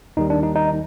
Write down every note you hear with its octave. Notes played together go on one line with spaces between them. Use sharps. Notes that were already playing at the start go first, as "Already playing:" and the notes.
D#2 D#3 G3 D#4
D4
D#4
D#4